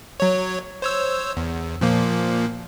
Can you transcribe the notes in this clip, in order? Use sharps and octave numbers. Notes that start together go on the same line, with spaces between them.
F#3 C#5
C5 C#5 E6
E2
A#2 F3 A#3